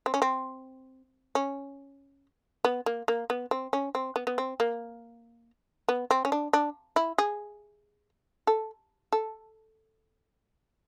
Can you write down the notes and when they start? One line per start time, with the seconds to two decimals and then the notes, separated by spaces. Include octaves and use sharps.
0.06 C4
0.14 C#4
0.22 C4
1.35 C#4
2.65 B3
2.86 A#3
3.08 A#3
3.30 B3
3.51 C4
3.73 C#4
3.95 C4
4.16 B3
4.27 B3
4.38 C4
4.60 A#3
5.89 B3
6.11 C4
6.25 C#4
6.32 D4
6.53 D4
6.96 E4
7.18 G#4
8.47 A4
9.13 A4